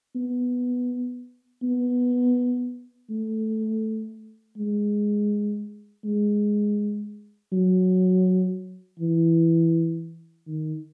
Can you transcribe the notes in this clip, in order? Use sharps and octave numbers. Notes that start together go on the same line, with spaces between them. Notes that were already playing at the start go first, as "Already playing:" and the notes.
B3
B3
A3
G#3
G#3
F#3
E3
D#3